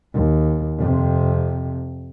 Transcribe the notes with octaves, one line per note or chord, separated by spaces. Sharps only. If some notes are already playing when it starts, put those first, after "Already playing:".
D#2
F2 C3